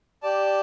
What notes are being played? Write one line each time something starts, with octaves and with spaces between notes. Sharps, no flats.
G4 D5 A5